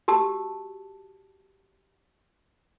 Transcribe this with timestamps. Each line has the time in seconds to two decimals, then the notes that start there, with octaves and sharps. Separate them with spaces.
0.08 F#4 G4 A5 E6